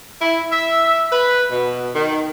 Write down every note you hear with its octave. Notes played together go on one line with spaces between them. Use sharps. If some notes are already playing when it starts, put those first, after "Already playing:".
E4
E5
B4
B2
D#3